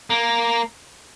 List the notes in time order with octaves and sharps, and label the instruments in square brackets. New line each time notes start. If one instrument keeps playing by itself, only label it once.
[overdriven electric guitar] A#3